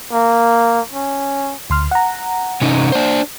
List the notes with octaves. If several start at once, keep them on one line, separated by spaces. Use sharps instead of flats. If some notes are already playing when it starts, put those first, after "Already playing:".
A#3
C#4
D2 C6 F6
F#5 A#5
C3 C#4 D#4
D4 C5